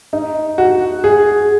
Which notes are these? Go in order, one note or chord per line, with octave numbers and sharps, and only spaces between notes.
D#4
F#4
G#4